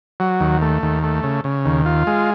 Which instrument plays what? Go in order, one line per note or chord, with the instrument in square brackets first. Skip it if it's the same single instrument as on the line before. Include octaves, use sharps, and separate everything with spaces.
[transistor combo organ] F#3
D#2
A3
D#2
A3
C#3
C#3
D#2
F4
G#3